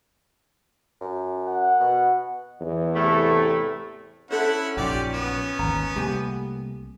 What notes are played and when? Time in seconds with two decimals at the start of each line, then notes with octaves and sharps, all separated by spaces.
1.01 F#2
1.45 F#5
1.80 B2
2.61 E2
2.95 A2 C3 A3
4.31 C#4 D4 E4 A4 C5 F#5
4.77 A#1 F#2 D#4 F4 G4 D5
5.13 B3
5.59 G#1 D#2 A#5
5.96 C2 A3 A#3 G4 G#5